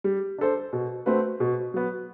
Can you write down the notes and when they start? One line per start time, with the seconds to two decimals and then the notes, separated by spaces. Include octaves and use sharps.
0.04 G3
0.38 D4 A4 C5
0.73 B2
1.06 A3 C4 F#4 B4
1.40 B2
1.74 F#3 B3